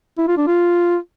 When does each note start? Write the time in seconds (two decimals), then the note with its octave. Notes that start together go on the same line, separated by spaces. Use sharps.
0.18 E4
0.28 F4
0.38 D4
0.47 F4